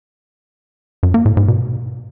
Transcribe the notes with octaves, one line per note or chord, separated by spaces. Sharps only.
F#2
A#3
A2
G#2
B2